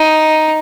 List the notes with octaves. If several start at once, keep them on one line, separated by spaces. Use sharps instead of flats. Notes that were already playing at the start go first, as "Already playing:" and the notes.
Already playing: D#4